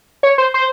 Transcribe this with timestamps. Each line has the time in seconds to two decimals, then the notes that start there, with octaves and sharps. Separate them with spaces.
0.23 C#5
0.38 C5
0.54 C5